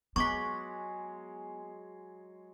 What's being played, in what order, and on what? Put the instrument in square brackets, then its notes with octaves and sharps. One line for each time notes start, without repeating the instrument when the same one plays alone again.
[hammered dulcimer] F#3 G#3 [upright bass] B3 [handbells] C#6 D6 B6